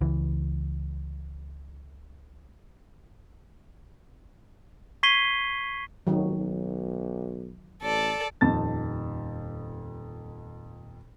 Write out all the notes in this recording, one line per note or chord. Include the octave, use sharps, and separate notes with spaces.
C#2 E3
C#6 G#6 B6 C7 D#7 G7
F1 D#3 F#3
B1
A1 A4 D5
D#1 F2 D#4 A5 A6